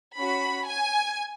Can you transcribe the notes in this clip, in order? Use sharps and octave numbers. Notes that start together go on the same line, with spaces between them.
C#4 F#4 B5
G#5